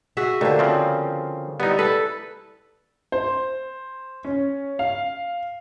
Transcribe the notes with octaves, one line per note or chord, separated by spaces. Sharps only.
F#4 G#4 E5
D#2 D3 A3 A#3 C5
C#3 F3 C4
G3 B3 D#4 E4
E4 A4 B4
C5
C#4
F5